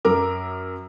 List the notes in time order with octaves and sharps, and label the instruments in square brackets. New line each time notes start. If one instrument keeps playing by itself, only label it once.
[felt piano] F#2 A#4 D6